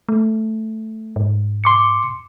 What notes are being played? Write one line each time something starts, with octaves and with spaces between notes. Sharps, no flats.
A3
G#2
C6 D6 C#7